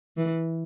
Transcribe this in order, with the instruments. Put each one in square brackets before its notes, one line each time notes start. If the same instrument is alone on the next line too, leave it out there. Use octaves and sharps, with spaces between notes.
[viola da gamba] E3